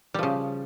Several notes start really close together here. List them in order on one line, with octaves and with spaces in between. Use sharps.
G3 F3 C#3